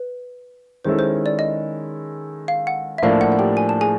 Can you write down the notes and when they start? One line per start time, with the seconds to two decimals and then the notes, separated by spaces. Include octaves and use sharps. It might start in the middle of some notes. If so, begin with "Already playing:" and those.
Already playing: B4
0.85 D#3 G#3 C#4 E4 A4 C5
0.99 C5
1.26 D5
1.39 D#5
2.48 F5
2.67 F#5
2.98 E5
3.03 A2 F3 A#3 D4 F5
3.21 F#5
3.32 F#5
3.39 G4 G5
3.57 G#5
3.69 A5
3.81 G#4 G#5